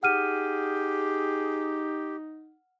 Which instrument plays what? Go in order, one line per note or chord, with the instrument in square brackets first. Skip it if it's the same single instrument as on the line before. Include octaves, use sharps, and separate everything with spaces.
[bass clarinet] D#4 [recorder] G4 [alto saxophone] G#4 [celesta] F#5 F6 D#7